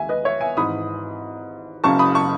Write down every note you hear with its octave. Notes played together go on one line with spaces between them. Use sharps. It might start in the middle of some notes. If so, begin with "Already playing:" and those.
Already playing: D#2 E5 G#5
B4 D#5
C#5 E5
E5 G#5
G#1 G#2 E3 B5 D#6
F#1 F#2 C#3 A5 C#6
B5 D#6
A5 C#6